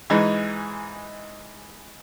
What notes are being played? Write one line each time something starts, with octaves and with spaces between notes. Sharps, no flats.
G#2 E3 G#3 D#4